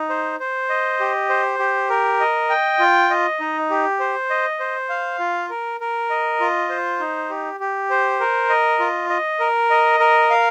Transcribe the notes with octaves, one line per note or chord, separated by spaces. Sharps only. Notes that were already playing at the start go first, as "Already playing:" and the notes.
Already playing: D#4
C5
C5
D#5
G4
C5
G4
A#4
D#5
G5
F4
D#5
D#4
G4
C5
D#5
C5
F5
F4
A#4
A#4
D#5
F4
C5
D#4
G4
G4
C5
A#4
D#5
F4
D#5
A#4
D#5
A#4
F5